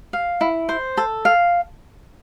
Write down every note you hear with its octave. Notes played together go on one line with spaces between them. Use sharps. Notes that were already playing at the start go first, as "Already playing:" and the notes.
F5
E4
C5
A4
F5